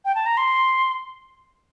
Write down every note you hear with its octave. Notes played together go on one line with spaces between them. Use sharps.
G5
A5
A#5
C6